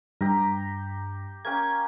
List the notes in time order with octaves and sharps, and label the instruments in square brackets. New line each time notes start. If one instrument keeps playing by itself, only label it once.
[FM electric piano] G2 [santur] G4 A#5
[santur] A#3 C#4 G5 [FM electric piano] G#6